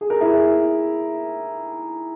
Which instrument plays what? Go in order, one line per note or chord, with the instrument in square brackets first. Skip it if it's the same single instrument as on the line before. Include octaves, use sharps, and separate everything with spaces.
[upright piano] G#4
A#4
E4 G#4